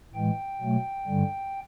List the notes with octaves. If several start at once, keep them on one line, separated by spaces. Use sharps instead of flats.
A2 E3 G#3 G5
B2 F#3 A3
G2 D3 G3